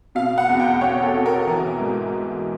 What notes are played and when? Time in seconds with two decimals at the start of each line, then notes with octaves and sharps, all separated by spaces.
0.15 B2 F5
0.38 F#5
0.49 E2
0.60 G5
0.81 E2 C#5
1.03 A4
1.14 B2
1.26 A#4
1.47 E3
1.80 G#2